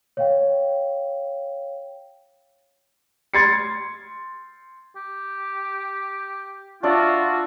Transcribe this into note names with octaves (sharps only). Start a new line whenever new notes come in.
C#5 F5 G5
C6 G#6 A6 C7 C#7
G4
D4 F4 F#4 D5 E5